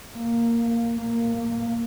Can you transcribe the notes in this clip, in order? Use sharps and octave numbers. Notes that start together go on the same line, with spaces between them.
A#3
A#3
A#3